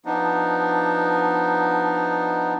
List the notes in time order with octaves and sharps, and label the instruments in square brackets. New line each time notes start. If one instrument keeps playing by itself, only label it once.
[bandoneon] F3 B3 D4 D#4